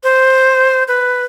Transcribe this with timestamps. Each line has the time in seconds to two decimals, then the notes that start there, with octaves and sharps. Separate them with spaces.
0.04 C5
0.88 B4